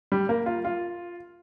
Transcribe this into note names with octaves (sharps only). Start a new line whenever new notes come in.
G3
A#3
F4
F4